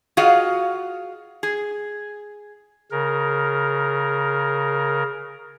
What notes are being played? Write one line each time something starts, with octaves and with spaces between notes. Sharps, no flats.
F4 F#4 G#4 D#5 F5 F#5
G#4
C#3 A#4